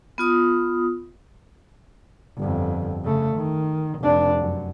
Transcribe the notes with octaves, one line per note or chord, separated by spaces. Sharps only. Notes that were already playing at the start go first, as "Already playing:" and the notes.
B3 F4 D#6
G1 F2
C#3 A3
D#3
F1 D4
F#2